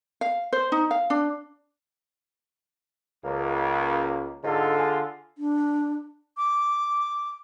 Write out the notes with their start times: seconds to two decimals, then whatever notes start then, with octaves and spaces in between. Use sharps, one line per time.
0.21 F5
0.53 C5
0.72 D#4
0.91 F5
1.10 D4
3.24 C#2 A#3
4.43 G#2 D3 F4 A4
4.78 G#4
5.38 D4
6.37 D6